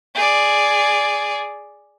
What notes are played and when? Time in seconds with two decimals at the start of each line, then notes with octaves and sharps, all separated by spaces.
0.15 G#4 D5